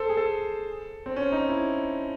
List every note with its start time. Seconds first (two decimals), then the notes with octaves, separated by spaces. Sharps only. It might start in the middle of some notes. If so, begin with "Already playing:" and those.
Already playing: A4 C5
0.09 G#4
0.17 A4
1.06 C4
1.16 C#4
1.32 D#4
1.49 E4